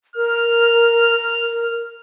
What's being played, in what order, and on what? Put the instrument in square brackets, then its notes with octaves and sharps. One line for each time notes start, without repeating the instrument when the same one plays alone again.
[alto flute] A#4 [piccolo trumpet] F6